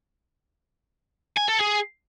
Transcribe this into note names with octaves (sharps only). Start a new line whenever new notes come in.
G#5
A4
G#4